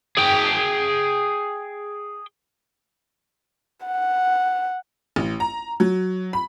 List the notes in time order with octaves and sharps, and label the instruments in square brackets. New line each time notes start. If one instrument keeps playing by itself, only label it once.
[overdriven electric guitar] G#4 G5
[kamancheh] F#5
[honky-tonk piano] A1
A#5
F#3
B5